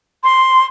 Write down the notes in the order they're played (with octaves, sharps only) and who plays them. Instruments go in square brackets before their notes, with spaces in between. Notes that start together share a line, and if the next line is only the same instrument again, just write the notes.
[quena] C6